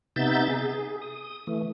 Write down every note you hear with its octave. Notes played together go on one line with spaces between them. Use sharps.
C3 B3 D#4 E5 G6 A6
G#4
D#6
E3 A3